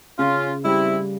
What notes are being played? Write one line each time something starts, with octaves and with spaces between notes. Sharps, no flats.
C#3 C#4 F4
G3 C4 E4